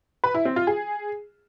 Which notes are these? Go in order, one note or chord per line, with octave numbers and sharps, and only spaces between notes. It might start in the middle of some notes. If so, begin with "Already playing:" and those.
B4
E4
C4
F4
G#4